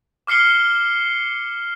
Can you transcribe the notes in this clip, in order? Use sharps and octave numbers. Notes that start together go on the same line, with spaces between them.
D6 F6 C7 C#7 G7